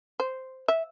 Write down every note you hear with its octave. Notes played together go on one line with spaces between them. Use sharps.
C5
E5